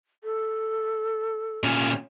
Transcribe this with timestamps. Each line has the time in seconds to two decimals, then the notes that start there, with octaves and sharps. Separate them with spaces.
0.23 A4
1.64 A#2 C#4